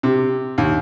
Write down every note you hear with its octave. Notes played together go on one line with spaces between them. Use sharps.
C3
D#2